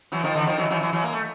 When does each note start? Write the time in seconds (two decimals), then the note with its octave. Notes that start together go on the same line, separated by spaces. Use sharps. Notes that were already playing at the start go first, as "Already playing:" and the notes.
0.12 E3 F#3
0.23 D#3 F3
0.35 D3 E3
0.47 D#3 F3
0.58 E3 F#3
0.70 E3 F#3
0.81 E3 F#3
0.93 E3 F#3
1.04 A#3
1.13 A3